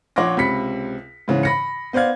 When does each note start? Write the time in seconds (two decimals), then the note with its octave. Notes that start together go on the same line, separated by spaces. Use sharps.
0.16 A#1 C#5 F#5 C6 D6 A#6
0.37 C#2 C3 B5 B6 C#7
1.28 G#2 C#3 E3
1.43 B5 A#6 C#7
1.93 B3 C5 D5 F5 G#6